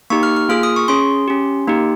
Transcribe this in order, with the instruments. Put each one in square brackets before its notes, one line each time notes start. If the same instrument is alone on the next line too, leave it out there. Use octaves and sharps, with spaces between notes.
[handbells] A#3 D#4 G4 C#6
F6
F6
A#3 F4 G#4 F6
D#6
C#6
C#4 G#4 C6
C#4 G4
A#3 D#4 G4